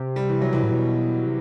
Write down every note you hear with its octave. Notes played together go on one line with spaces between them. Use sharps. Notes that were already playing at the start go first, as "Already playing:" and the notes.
Already playing: C3
G3
E3
F#3
C3 E3
A2
B2
C3